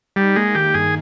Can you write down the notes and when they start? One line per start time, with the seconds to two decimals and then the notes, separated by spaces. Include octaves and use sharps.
0.16 G3 D#4
0.36 G#3 A#3
0.55 D#3 G4
0.74 G2 G#4